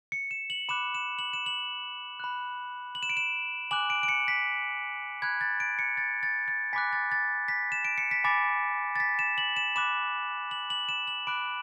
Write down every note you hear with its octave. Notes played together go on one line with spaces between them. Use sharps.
C#7
E7
F#7
B5 D6 F#6 E7
E7
F#7
E7
F#7
B5 F#6
F#7
E7
D7
E7
G#5 D6 F#6 F#7
D7
D7
C#7
B6
B5 F#6 G#6
A6
D7
C#7
A6
A6
A6
G#5 B5 D6 F#6 B6
A6
A6
B6
E7
D7
C#7
B6
G#5 B5 D6 A6
A6
B6
E7
F#7
E7
B5 D6 F#6 E7
F#7
F#7
E7
F#7
B5 D6 F#6 D7